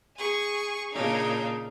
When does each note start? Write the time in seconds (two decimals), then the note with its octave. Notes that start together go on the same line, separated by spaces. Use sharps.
0.17 G#4 G#5 C#6
0.92 A#2 C#3 D4 D#4